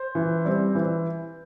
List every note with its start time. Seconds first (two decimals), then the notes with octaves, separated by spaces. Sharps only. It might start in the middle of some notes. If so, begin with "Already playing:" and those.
Already playing: C5
0.15 E3
0.45 G3 C4
0.75 E3